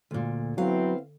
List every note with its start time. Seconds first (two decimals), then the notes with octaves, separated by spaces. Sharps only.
0.11 D2 A#2
0.58 F#3 B3 C4 E4 F5